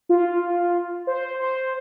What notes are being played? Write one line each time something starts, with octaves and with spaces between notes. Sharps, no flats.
F4
C5
C5